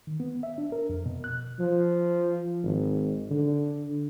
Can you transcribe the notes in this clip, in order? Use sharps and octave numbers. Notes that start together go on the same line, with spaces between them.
D#3
B3
E5
D4
A#4
F2
B2
F#6
F3
G#1
D3